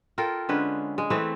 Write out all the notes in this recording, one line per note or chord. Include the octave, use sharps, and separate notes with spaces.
F4 A4 A#4 G5
D3 G#3 C#4 B4
G#3
E3 A3 C4 B4